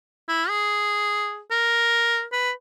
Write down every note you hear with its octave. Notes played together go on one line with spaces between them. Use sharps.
E4
G#4
A#4
B4